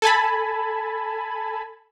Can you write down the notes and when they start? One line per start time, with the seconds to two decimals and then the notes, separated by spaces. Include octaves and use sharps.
0.02 A4 G#5 A5 B5